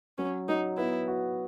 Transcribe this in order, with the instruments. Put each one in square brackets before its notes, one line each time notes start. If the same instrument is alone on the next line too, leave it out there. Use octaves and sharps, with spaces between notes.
[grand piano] F#3 [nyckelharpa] C#4
[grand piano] F#3 [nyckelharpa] D#4
[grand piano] B3 [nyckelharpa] E4
[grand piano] F#4